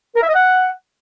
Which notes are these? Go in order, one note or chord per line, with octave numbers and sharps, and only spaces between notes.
A#4
E5
D#5
F#5